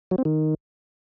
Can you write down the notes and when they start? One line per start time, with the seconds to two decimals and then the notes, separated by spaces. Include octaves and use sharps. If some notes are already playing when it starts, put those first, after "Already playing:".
0.11 F#3
0.18 C4
0.25 D#3